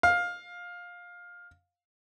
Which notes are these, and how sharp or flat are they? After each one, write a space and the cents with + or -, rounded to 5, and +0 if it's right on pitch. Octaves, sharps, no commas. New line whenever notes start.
F5 +15